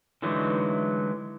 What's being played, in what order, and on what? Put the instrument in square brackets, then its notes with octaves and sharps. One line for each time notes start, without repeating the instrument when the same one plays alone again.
[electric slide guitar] D3 E3 F#3 G#3 A3 D#4